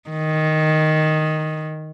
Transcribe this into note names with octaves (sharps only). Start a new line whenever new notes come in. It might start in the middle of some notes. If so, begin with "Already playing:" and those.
D#3